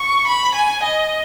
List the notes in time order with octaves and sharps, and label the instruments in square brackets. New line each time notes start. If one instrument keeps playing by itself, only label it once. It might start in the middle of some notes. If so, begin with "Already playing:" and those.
Already playing: [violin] C#6
B5
G#5
D#5